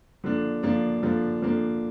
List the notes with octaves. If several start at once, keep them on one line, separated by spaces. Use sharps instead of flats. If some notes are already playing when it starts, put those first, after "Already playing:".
D3 F3 A#3 D4
D3 F3 A#3 D4
D3 F3 A#3 D4
D3 F3 A#3 D4